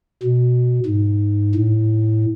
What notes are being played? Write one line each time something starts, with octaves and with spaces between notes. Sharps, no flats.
B2
G#2
A2